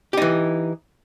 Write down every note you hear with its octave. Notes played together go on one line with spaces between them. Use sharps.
E3 D#4 G4